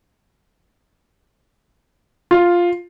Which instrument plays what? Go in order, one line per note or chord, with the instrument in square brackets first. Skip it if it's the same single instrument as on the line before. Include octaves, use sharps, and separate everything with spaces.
[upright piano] F4